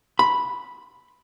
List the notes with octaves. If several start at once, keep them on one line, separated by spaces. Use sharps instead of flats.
B5